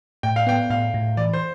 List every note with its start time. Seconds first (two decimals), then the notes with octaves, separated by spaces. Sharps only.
0.23 A2 G5
0.36 F5
0.47 B3 G5
0.70 A2 F5
0.94 A2
1.17 E3 D5
1.33 C5